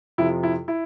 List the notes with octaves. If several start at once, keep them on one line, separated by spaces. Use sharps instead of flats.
F2 C3 F3 E4
E4
E4